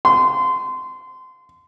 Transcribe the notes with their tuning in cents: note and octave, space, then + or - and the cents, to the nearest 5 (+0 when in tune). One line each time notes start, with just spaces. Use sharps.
C6 -25